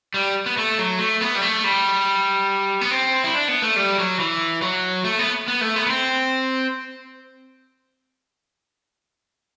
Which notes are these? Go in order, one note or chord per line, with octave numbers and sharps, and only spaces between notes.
G3
B3
A3
F#3
A3
B3
G3
A3
G3
B3
C4
E4
D4
B3
A3
G3
F#3
E3
F#3
A3
B3
B3
A3
B3
B3
C4